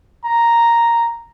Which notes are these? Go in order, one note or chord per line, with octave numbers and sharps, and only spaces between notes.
A#5